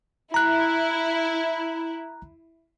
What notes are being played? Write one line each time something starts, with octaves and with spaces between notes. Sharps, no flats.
E4 A#5 F#6